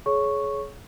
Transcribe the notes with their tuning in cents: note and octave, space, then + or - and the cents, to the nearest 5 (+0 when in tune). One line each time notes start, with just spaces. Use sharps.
G#4 +30 C#5 +5 C#6 -5